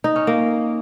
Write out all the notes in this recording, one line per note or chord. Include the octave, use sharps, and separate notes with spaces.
D#4
C#4
A#3